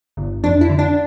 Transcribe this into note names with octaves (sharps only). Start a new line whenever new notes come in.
G1
F2 D4
E4
D3
D4